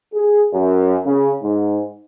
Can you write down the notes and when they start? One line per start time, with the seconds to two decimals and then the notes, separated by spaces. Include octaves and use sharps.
0.14 G#4
0.53 F#2
1.06 C#3
1.42 G#2